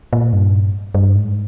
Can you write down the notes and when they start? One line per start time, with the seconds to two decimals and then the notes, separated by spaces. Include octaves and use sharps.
0.13 A#2
0.33 G2
0.95 G2
1.15 G#2